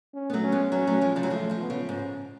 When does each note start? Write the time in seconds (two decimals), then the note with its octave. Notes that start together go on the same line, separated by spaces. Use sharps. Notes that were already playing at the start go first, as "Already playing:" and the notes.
0.14 C#4
0.30 B3
0.33 F#3 A3
0.43 C#4
0.52 G#3 B3
0.72 F#3 A3 C#4
0.87 F#3 A3
1.02 F3 G#3
1.16 C#3 F3
1.23 F#3
1.30 F3 G#3 A3
1.50 F3 G#3
1.60 B3
1.70 C#3 F3
1.89 G#2 C#4